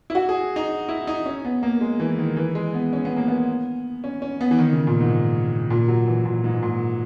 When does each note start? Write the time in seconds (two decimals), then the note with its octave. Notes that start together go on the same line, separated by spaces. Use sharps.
0.10 E4
0.15 F#4
0.29 G#4
0.56 D#4
0.89 E4
1.07 D#4
1.26 C#4
1.45 B3
1.63 A#3
1.81 G#3
2.00 E3
2.18 D#3
2.37 E3
2.55 G#3
2.74 B3
2.93 C#4
3.05 B3
3.17 A#3
3.28 B3
4.04 C#4
4.22 C#4
4.41 B3
4.51 E3
4.59 D#3
4.73 C#3
4.87 A#2
5.00 G#2
5.70 A#2
5.88 F#3
6.07 E3
6.25 A#2
6.44 G#2
6.63 A#2